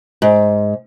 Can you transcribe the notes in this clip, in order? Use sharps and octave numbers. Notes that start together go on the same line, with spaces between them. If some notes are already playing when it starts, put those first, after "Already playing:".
G#2